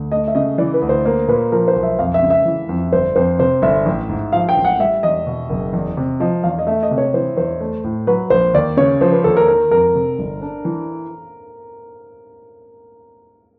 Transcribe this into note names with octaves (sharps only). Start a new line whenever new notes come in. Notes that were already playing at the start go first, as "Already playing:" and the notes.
Already playing: D2
A3 D#5
E5
C#3 D#5
E3 D5
B4
D2
C5
A#3 C5
A#2 B4
F3 A#4
C5
B1
E5
F2 F5
E5
C#3
E5
E3
F2
G1 C5
F2 C5
C3 C5
G1 E5
A1
G#2
F3 F5
G5
A1
F#5
G3 E5
E2 D#5
B2
F#1
E2
C3
F3 D#5
E2 F5
D#5
A3 E5
D#5
C3
C#5
E3 C5
E2 C5
A3
A2
F#3 B4
A#1 C5
D#2 D5
C#3 C#5
F3 C5
B4
D#2 A4
A#4
D#3 A#4
F2 A#4
C3
G1
D4
E3